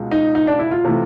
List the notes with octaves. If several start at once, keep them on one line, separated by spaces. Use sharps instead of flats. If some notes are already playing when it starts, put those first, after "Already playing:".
Already playing: C#2 B2 G#3
D#4
D#4
D4
E4
F4
C3 E3 A3